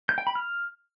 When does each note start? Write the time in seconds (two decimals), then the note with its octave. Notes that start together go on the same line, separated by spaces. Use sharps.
0.09 G6
0.18 G5
0.27 B5
0.35 F6